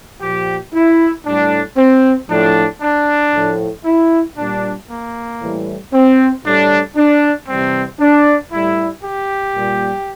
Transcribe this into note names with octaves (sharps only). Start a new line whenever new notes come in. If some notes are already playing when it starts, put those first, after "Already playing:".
A#2 F3 G4
E4
A2 G3 D4
C4
A2 F3 D4
D4
A2 F3
E4
A#2 G3 D4
A#3
A2 E3 G3
C4
A2 G3 D4
D4
C3 E3 G3 C4
D4
A2 G3 E4
G4
A#2 G3